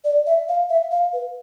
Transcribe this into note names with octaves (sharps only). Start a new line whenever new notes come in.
D5
E5
F5
E5
F5
B4